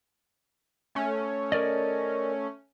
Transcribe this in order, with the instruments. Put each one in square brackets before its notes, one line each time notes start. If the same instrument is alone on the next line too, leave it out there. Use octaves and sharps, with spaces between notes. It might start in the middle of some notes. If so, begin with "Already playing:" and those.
[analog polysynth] A3 C#4
[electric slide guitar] A#4 D5 D#5